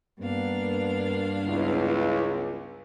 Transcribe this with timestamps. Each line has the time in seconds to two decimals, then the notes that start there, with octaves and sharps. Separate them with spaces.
0.21 G2 A#3 B3 D4 F5
1.45 C#2 B3 E4